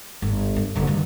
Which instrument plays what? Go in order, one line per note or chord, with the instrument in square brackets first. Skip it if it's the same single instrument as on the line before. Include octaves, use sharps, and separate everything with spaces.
[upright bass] G1
G2
F#1 D3
G2 D#3